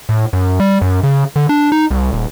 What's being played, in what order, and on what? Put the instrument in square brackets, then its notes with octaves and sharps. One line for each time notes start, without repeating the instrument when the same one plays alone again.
[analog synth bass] A2
F#2
G3
F#2
C#3
D3
D4
D#4
C2
D#1